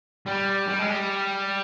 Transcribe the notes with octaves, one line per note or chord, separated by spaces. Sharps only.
G3
G3
G#3
G3